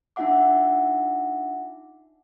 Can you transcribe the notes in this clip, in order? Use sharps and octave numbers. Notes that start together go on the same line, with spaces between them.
D4 D#4 F4 E5 F#5 D6